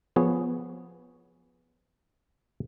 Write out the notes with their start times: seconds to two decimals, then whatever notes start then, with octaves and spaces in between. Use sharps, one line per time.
0.16 F3 B3 G#4 C#5